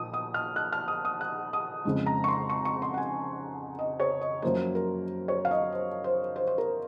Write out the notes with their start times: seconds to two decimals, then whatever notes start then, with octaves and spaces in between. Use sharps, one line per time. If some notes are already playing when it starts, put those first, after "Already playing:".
Already playing: A#2 F3 A#3 D#6
0.14 D#6
0.34 F6
0.56 F#6
0.73 F6
0.88 D#6
1.05 D#6
1.21 F#6
1.53 D#6
1.85 F2 C#3 G#3
2.06 A#5
2.24 C#6
2.28 C6
2.50 C#6
2.65 C#6
2.82 C6
2.94 F#5
2.98 G#5
3.79 D#5
4.00 C#5
4.21 D#5
4.42 F#2 F3 A#3 C5
4.75 A#4
5.28 C#5
5.45 F5
5.51 D#5
5.72 C5
6.04 C5
6.36 C5
6.47 C5
6.58 A#4